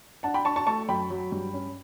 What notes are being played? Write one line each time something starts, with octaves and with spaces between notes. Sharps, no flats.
D4 F#5 A5
G5 B5
D4 A5 C#6
A5 C#6
A3 A5 C#6
F#2 G5 B5
F#3
G2
C#4